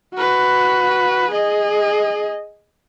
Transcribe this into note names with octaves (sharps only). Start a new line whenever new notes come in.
F#4 B4
G#4 D#5